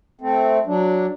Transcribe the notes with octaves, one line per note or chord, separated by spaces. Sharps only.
A3 C4
F#3 D4